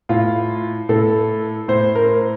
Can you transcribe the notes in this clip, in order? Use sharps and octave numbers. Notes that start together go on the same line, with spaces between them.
A2 F4
A2 A4
A2 C5
A#4